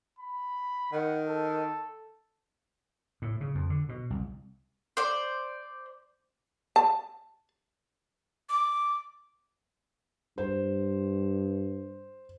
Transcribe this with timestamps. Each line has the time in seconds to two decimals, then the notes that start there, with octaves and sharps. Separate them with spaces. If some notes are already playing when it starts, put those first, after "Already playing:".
0.19 B5
0.93 D#3 F#5
1.26 A4
3.22 A2
3.41 C#3
3.55 F2
3.70 D3
3.89 B2
4.10 C2
4.97 C5 D5
6.76 A5
8.49 D6
10.38 G2 C5